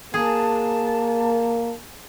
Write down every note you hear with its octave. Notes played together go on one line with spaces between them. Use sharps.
A#3 G#4 A5